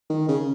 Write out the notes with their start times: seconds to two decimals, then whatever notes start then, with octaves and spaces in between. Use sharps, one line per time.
0.10 D#3
0.29 C#3